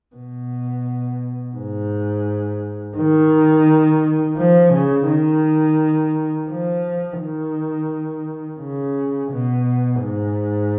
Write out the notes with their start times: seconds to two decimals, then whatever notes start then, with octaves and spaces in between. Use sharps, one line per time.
0.15 B2
1.56 G#2
2.97 D#3
4.37 F3
4.73 C#3
5.08 D#3
6.49 F3
7.20 D#3
8.60 C#3
9.31 B2
10.02 G#2